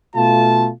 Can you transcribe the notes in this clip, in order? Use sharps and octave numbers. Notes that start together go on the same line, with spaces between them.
B2 A3 F4 A5